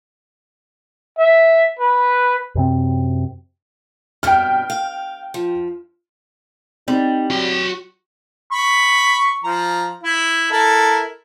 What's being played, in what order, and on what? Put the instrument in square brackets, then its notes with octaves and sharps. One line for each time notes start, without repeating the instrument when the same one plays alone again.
[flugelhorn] E5
B4
[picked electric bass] F#2 C3 C4
[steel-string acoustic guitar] G2 B2 [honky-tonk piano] G5 F6
[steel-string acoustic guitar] F5
F3
[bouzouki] G3 [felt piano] C4 [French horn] D#4
[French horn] F#3 [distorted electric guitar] F#4 G5
[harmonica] B5 C#6
F3 A#5
E4
E4 A4 A#4